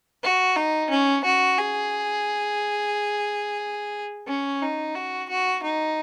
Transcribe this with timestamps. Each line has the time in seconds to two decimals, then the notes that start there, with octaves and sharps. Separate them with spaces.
0.23 F#4
0.56 D#4
0.90 C#4
1.25 F#4
1.59 G#4
4.28 C#4
4.62 D#4
4.95 F#4
5.29 F#4
5.63 D#4